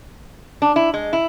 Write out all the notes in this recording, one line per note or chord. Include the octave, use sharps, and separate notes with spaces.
D4
E4
G#3
E4